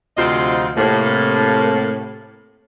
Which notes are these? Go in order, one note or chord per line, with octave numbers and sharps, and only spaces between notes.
D2 C3 F3 C4 F4 D#5
A2 C3 A#3